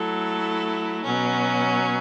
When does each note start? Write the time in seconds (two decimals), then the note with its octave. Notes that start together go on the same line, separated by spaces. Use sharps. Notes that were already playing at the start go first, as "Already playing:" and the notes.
Already playing: F#3 A3 E4 A4
1.04 B2 F#3 C#4